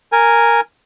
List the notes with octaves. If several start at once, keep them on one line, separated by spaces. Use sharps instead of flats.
A#4 G#5